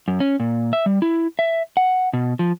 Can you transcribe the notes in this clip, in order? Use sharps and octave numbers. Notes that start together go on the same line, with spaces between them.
F#2
C#4
A#2
E5
G3
E4
E5
F#5
B2
F3